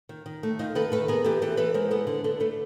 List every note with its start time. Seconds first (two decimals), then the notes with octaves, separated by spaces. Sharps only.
0.09 D#3
0.26 D#3
0.43 A3
0.59 D#3 D#4 F4
0.75 D#3 A4 B4
0.92 A3 A4 B4
1.08 B3 G#4 A#4
1.24 E3 G4 A4
1.42 E3 G4 A4
1.57 E3 A4 B4
1.74 G#3 A#4 C5
1.91 B3 A4 B4
2.07 D3
2.24 D3 A4 B4
2.40 A3 A4 B4